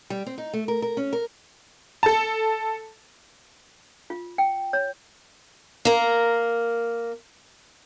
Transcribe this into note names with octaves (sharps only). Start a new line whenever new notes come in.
G3
C4
D#4
A3
A#4
A#4
C#4
A#4
A4 A5
F4
G5
C#5
A#3 A#4